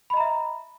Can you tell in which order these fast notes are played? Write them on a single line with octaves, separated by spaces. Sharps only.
B5 D#5 A#5 E5